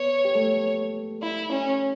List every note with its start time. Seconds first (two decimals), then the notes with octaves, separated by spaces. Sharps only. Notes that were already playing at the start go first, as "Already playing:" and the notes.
Already playing: B3 B4 C#5
0.25 G4
0.35 A3 A4
1.22 E4
1.51 C#4